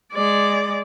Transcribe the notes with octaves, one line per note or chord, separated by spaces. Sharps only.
G#3 D5